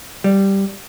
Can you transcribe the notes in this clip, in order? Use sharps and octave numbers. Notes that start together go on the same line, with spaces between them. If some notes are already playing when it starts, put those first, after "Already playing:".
G3